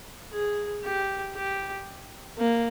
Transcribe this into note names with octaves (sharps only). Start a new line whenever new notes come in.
G#4
G4
G4
A#3